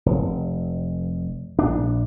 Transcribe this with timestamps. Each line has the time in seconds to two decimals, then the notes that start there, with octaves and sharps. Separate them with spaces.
0.06 F1
1.59 A#1 D4